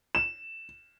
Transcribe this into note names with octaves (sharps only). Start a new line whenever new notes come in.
E7